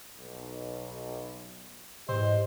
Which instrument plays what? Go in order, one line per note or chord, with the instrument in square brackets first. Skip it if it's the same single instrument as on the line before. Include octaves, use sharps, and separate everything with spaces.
[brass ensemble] B1
[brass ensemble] E2 G4 D#5 [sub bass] G#2 [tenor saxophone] C5